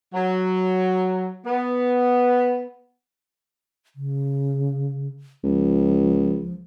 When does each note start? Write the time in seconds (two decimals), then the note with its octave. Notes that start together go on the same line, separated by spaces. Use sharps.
0.14 F#3
1.46 B3
3.96 C#3
5.44 C#2 F3